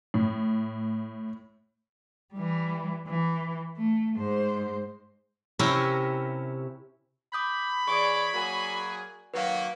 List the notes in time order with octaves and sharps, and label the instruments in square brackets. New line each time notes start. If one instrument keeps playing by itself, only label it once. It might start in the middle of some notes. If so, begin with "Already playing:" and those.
[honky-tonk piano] A2
[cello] E3 G3
E3
A3
G#2 C5
[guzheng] C3 C#4 E4 G4 A#4
[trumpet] B5 [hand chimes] D6 D#6 G6
[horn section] E3 G#4 C#5 [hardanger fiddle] D5 D6 [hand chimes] C#6
[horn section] F#3 A#3 G#4 [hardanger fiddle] F#4 G#5
[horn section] D#3 F#3 A#3 [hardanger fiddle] F#4 [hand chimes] B4 F5